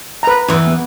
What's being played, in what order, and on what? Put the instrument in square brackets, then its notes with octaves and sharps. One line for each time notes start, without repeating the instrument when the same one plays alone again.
[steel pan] B4 A#5
[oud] E2 E3
[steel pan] B3